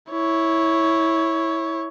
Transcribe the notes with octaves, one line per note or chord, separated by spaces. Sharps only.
E4 C#5